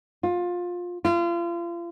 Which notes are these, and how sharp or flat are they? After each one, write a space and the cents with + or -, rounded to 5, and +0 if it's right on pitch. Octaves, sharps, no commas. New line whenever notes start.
F4 +20
F4 -35